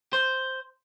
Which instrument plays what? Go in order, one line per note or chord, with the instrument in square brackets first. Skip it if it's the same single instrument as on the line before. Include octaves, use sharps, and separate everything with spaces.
[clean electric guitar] C5